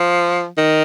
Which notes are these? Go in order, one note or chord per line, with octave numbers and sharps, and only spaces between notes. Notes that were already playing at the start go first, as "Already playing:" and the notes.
Already playing: F3
D#3